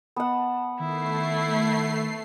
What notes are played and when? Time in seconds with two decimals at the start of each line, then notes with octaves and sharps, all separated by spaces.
0.16 B3 F#5 A5
0.80 D#3 A3 E4 C7